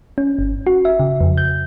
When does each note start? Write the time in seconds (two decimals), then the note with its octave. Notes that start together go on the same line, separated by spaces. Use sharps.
0.18 C#4
0.39 G1
0.67 F#4
0.85 E5
1.00 C#3
1.21 F2
1.37 G6